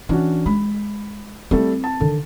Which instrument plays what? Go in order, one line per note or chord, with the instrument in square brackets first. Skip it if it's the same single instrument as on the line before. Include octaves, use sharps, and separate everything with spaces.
[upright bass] E3 [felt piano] C#4 D4 F#4
[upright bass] G#3 [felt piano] B5
[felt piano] G3 A3 A4 [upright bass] C4 E4
[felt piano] A5
[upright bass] D3 D#3